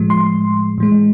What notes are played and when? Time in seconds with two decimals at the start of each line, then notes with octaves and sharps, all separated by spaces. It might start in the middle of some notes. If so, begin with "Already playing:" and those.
Already playing: A2 F3 G#3
0.10 C6
0.78 A2 E3 G#3